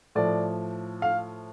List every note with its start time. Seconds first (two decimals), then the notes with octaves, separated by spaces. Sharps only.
0.15 A2 F3 D5
1.02 F5